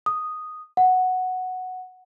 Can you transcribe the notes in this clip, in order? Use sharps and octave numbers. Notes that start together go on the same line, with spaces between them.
D#6
F#5